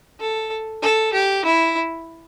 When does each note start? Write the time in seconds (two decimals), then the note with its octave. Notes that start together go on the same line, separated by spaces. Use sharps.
0.20 A4
0.82 A4
1.13 G4
1.45 E4